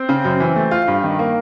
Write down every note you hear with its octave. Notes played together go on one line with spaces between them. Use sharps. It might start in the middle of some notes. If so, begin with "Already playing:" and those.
Already playing: C4
C#3
F#2
E3
A3
F4
G2
D#3
A#3